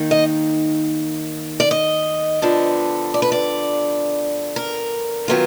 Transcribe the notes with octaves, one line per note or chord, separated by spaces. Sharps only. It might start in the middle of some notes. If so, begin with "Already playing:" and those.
Already playing: D#3 A#3 D#4
D#5
D5
D#5
D3 F3 B3 D4
D5
B4
D5
A#4
D#3 F#3 B3 F4